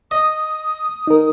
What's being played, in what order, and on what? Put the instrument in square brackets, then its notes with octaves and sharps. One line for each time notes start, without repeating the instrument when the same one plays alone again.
[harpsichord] D#5 [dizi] D#6
[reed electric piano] D#4 A#4